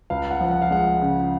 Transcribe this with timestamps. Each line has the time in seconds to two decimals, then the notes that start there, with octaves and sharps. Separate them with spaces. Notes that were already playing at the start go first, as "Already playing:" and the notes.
0.10 C#2 F5
0.31 F#5
0.41 F3
0.51 F#5
0.62 F5
0.71 G#3 F#5
1.01 C#3